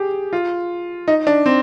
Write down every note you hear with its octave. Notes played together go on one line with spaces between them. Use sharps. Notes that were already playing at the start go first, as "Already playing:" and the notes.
Already playing: G4 G#4
F4
D#4
D4
C4